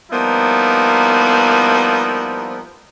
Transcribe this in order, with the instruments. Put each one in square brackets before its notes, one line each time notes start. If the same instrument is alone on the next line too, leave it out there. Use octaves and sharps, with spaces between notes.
[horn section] F3 G3 A#3 B3 D#4 E4